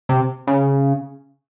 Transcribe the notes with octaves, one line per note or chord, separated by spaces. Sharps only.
C3
C#3